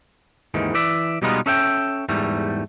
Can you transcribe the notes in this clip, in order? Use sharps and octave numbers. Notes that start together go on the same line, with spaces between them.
D#2 G#2 D#3 E3
E3 D5 E5
B2 G3 G#3 B3 D#4 F4
C#4 A4 E5 F#5 G5
E2 G#2 G3 A3